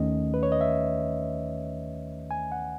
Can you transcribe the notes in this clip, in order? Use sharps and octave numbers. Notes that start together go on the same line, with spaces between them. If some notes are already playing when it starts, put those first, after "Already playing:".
Already playing: D#2 D#3 A3 C#4 D#5
B4
C#5
D#5
E5
G#5
F#5